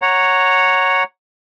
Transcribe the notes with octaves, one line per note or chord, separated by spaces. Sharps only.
C#5 F#5 A#5